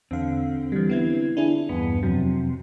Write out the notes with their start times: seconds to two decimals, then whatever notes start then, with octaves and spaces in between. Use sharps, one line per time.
0.11 E2 D3 C4 F5
0.72 E3 G3
0.89 B3 E4 G#6
1.37 D4 E4 G#4
1.69 E2 G2 B3
2.03 F2 C3 F#3